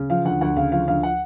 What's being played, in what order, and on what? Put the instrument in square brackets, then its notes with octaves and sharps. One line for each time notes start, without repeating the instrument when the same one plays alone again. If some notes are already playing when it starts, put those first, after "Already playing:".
Already playing: [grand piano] C#3
F3 F5
D2 F#5
D2 F#5
C#3 F5
F3 F5
D2 F5
F#5